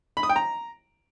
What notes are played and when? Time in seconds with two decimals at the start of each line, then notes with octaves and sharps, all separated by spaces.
0.17 B5
0.23 D#6
0.29 G5
0.36 A#5